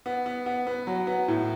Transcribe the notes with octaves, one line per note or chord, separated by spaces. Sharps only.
B3
B3
B3
B3
F#3
B3
A2